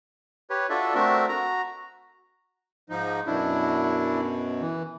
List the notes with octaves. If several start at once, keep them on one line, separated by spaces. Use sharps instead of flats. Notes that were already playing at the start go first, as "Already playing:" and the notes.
G4 B4 C#5
D4 F4 F#4 A4 D5 E5
A3 C4 D4 F#4 A#4 E5
F#4 A#5
G#2 F3 D#4
F#2 B2 D4 E4
E3